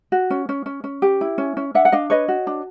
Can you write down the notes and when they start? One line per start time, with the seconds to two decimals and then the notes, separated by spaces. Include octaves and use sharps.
0.12 F#4
0.30 C#4
0.49 C#4
0.66 C#4
0.84 C#4
1.02 G4
1.21 E4
1.38 C#4
1.57 C#4
1.74 D4 E5 F#5
1.85 F#5
1.92 D4 D#5 F5
2.10 B4 C#5 D#5
2.28 F#4
2.47 D4